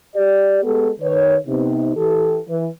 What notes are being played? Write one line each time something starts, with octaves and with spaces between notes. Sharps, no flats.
G4 D5
G#3 B3 G4 A4
D#3 B4 C#5
C3 B3 D#4
E3 G4 A4
E3 B4